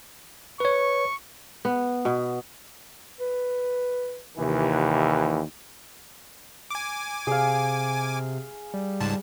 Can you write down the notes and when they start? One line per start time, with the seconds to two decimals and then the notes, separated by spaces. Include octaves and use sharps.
0.60 B4 C#5 C#6
1.65 B3
2.05 B2
3.20 B4
4.37 D#2 C3 E3
6.71 G#5 D6
7.27 C3 G#4 F5
8.74 G3
9.01 C#2 G#2 A5